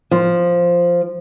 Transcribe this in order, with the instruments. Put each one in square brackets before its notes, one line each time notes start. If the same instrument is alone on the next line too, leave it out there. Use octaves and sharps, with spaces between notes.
[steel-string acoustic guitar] F3